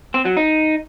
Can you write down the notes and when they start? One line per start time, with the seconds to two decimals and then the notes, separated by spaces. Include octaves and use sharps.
0.14 C4
0.25 F#3
0.37 D#4